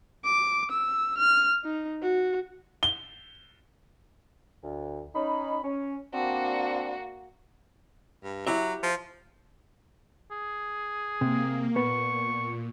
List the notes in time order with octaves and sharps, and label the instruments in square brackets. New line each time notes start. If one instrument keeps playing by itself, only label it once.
[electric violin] D6
E6
F6
D#4
F#4
[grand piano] G7
[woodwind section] D2
C#4 D#4 B5
C#4
[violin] A#3 F#4 [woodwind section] C4 D4
[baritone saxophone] G2
[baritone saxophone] F#3 [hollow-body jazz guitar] E4 G4 E5
[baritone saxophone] F3
[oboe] G#4
[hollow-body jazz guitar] C3 [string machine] A#3
[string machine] A#2 [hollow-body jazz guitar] B3 [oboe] C#6